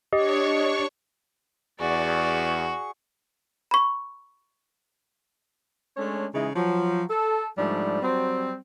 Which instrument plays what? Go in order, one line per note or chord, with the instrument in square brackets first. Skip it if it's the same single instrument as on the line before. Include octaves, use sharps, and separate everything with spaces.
[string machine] D4 C#5 C#6 [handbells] G4 [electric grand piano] D#5
[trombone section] E2 [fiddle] F#4 [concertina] G#4 C#6 [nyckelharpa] D5
[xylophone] B5 C#6
[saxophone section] G#3 A3 C#4 D4 C#5
C#3 E3 G#3 D#4 E4
F3 F#3
A4
G#2 F3 G3 A3 D4
F#3 G3 C4